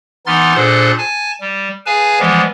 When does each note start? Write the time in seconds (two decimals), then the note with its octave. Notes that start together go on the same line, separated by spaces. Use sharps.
0.27 E3 B3 D#4 C6 F6 A6
0.55 A#2 D4 G#4 A4 C5 F#6
0.98 G#5 A5
1.41 G3
1.86 G#4 B4 F5 G#5 A5
2.20 E3 F3 G3 G#3 B3